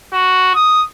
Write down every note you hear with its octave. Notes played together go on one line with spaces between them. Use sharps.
F#4
D#6